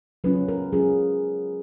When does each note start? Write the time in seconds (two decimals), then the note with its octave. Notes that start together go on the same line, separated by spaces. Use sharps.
0.24 F#3 C#4 F4 B4
0.48 A#4
0.72 F#3 C#4 F4 G#4